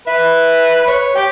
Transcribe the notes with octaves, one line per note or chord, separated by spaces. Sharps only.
B4 E5
C#5
G4 G5